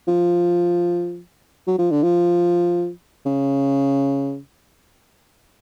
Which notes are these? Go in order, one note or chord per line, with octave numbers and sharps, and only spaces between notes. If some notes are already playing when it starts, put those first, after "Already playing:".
F3
F#3
F3
D3
F3
C#3